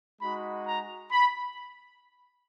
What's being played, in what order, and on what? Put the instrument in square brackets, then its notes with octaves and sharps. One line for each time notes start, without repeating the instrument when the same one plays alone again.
[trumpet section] G#3 D#4 F#4 B5
A#5
B5